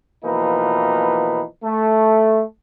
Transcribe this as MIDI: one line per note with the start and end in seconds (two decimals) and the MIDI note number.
0.24 1.43 47
0.24 1.43 52
0.24 1.43 53
0.24 1.43 58
0.24 1.43 63
0.24 1.43 71
1.63 2.41 57